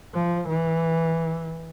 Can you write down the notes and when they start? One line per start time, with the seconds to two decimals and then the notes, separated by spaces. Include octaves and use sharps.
0.14 F3
0.49 E3